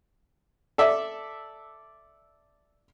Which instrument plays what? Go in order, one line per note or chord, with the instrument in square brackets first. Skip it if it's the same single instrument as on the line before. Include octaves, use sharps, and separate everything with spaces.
[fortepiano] A4 D5 E5